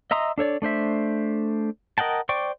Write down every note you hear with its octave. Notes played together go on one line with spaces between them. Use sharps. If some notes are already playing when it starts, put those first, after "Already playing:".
D#5 E5 A#5 C6 D#6
D4 A4 C#5 D5
A3 D4 C5 E5
A#4 D#5 F#5 G5 A5
C5 D5 G5 C#6 D6